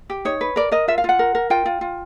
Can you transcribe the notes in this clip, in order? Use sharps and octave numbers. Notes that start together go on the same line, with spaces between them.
G4
D#4 C#5
B4
A#4 D5
A#4 D#5
F4 E5
F5
F4 F#5
A#4
A#4
F4 G5
F4
F4